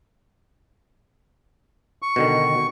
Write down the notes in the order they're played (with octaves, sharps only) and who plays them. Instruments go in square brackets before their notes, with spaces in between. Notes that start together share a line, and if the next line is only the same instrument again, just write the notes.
[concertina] C#6
[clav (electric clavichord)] B2 D3 D#3